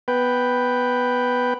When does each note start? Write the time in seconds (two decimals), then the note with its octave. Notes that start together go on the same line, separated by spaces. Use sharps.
0.08 B3 B4 G5